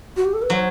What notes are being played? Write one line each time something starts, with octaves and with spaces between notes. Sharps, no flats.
F#4
G4
A4
B4
F#3 C5